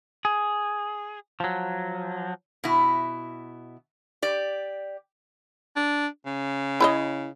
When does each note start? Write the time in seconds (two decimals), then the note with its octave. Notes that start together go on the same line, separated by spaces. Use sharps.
0.25 G#4
1.40 F3 F#3
2.64 B2 E4
4.22 G4 D5
5.76 D4
6.26 C#3
6.80 E4 C#5 D#5